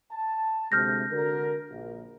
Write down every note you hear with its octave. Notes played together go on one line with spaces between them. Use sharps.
A5
D2 C3 G#3 F6 G6 A#6
D3 F#4 A#4
A#1